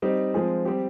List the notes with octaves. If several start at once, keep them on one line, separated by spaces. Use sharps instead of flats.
G3 C4 D#4
F3 G#3 C4 F4 G#4
G3 C4 G4